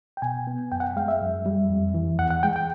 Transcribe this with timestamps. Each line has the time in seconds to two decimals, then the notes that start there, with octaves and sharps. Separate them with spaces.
0.17 G5
0.22 B2 G#5
0.47 B3
0.72 F#2 G5
0.80 F#5
0.84 G5
0.97 G#3 F5
1.08 E5
1.21 F#2
1.46 G3
1.70 F2
1.94 E3
2.19 E2 F#5
2.31 F#5
2.43 G#3 G5
2.56 G5